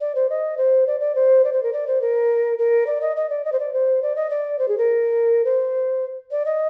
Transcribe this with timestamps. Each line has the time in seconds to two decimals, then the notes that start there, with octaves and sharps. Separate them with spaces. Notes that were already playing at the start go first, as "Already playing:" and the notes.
0.01 D5
0.15 C5
0.30 D#5
0.57 C5
0.87 D5
1.00 D5
1.15 C5
1.44 D5
1.53 C5
1.63 A#4
1.73 D5
1.87 C5
2.01 A#4
2.58 A#4
2.87 D5
3.01 D#5
3.16 D#5
3.30 D5
3.45 D#5
3.52 C5
3.60 D5
3.73 C5
4.02 D5
4.16 D#5
4.30 D5
4.59 C5
4.68 G#4
4.78 A#4
5.45 C5
6.31 D5
6.46 D#5